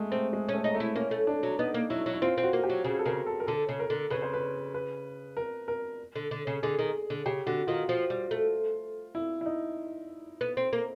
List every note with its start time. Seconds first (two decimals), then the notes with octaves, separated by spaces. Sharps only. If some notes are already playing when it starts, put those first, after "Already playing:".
Already playing: G#3 A3
0.11 A3 C4
0.33 G#3
0.49 C#4
0.54 A3
0.64 D#4
0.74 A3
0.80 E4
0.96 A#3 C#4
1.11 A3
1.27 D4
1.43 F#3
1.59 B3 D#4
1.74 A#3
1.90 F#3 E4
2.06 F#3
2.13 E4
2.22 C4 F4
2.38 C4
2.43 F#4
2.53 A#3
2.63 G4
2.69 F#3
2.84 C#3 G#4
2.99 A4
3.06 C#3 A#4
3.26 A4
3.40 A#4
3.47 D3 A4
3.69 C#3
3.80 A#4
3.90 D3
4.10 C#3 B4
4.22 C5
4.34 B4
4.74 B4
5.37 A#4
5.68 A#4
6.15 D3
6.31 D3
6.47 C#3
6.63 D3 G#4
6.79 D#3
7.10 D3
7.26 C#3 G4
7.46 D3 F#4
7.67 D#3 F4
7.89 F3
8.10 G3
8.31 A3
9.15 E4
9.41 E4
9.46 D#4
10.41 B3
10.57 C4
10.73 A#3